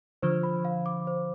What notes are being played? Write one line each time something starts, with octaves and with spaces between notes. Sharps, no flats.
D3 F3 C5
B5
F5
D6
C5